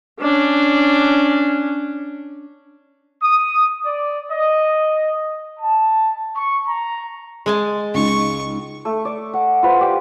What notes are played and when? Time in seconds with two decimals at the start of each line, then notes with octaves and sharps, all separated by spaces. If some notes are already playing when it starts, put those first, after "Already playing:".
0.21 C#4 D4
3.21 D#6
3.86 D5
4.31 D#5
5.60 A5
6.36 C#6
6.68 A#5
7.46 G#3 G#5 A5
7.94 C#2 D#4 C#6
8.85 A3
9.05 D5
9.34 F#5
9.63 F4 B4 C5
9.81 G4 D5 F5